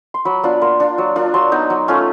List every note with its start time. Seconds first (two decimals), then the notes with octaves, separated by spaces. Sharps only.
0.14 C6
0.25 F#3 B5
0.43 B3 D4 F4
0.61 A#3 C6
0.80 D4 F4
0.98 F#3
1.16 A#3 D4 F4
1.34 F#3 C6
1.52 B3 D#4
1.70 F#3
1.88 A3 C#4 F4